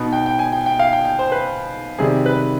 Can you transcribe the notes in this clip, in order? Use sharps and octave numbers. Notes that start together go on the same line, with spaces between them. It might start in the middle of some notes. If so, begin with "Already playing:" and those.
Already playing: B2 B3 D#4
G5
G5
G#5
G5
G5
F5
G5
G5
C5
B4
C3 D#3 G3 G#4
B4